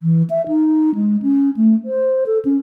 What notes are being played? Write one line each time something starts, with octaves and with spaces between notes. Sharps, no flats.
E3
E5
D#4
G#3
C#4
A3
C5
A4
C#4